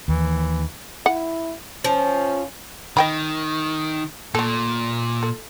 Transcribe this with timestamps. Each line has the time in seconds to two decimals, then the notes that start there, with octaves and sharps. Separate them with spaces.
0.08 D#2 E3
1.06 E4 F#5
1.84 F3 C#4
2.97 D#3 D#5 G5 B5
4.35 A#2 A3 A4
5.23 A4